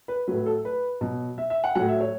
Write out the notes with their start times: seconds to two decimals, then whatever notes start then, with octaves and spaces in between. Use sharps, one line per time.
0.08 B4
0.27 A2 F#3 B4
0.46 A4
0.65 B4
1.01 B2 F#3
1.38 E5
1.50 E5
1.64 F#5
1.75 A2 F#3 F#5
1.88 E5
2.00 C#5